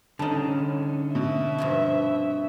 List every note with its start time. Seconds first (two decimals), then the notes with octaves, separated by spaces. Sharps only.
0.19 D3 G3 C#4 D#4 A5
1.15 B2 E5
1.58 G2 C3 F3